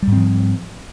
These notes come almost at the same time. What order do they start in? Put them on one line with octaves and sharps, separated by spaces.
G3 G#2 C4 F3